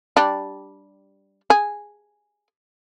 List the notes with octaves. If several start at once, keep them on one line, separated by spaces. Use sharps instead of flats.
G3 D4
G#4